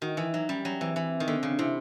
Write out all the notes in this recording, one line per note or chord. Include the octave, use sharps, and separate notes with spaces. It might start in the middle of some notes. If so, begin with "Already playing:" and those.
D#3 F#4
E3
E4
F#3 D#4
G3 C#4
F#3 C#4
E3 C4
E3
D#3
D3 B3
C4
C#3
C4
C3 E4